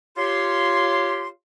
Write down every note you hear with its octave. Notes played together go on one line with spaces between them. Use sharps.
F4 G4 C#5 C6